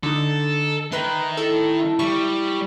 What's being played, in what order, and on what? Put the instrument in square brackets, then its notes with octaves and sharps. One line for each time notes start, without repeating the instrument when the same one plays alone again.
[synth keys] D3 D#4 [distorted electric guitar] A4
[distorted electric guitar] D#3 [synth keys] B4 C6 [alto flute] E5
[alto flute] E4 [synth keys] A4
[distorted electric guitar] G3 [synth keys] C#6